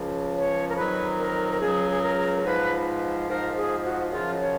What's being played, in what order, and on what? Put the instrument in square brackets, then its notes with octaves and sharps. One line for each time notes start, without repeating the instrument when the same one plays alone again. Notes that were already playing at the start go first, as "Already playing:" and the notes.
Already playing: [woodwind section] C#2 C#3 F3
C#5
A#4
F2 D#3 F#3 B4
A#4
A#4
C#2 C#3 F#3 G#4
G#4
A#4
G#2 F3 B4
G#2 F3 A#4
G#4
F#4
F#2 C#3 F3 F4
D#5
C#5